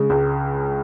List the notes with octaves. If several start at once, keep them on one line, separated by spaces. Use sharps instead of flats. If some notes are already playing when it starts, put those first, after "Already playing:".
Already playing: C#3 G#3
C#2